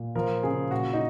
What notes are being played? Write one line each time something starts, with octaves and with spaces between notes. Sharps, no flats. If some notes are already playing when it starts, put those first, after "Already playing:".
Already playing: A#2
F3 A#4
C#3 G#4
A#2 F#4
D#4